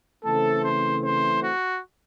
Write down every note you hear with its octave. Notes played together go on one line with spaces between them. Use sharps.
C#3 E3 A3 C4 A4
C5
C5
F#4